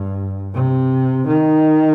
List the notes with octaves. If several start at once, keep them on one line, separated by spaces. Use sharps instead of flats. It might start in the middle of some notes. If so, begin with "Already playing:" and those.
Already playing: G2
C3
D#3